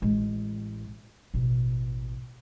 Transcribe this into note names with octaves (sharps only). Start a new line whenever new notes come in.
A1 G#3
A1 B2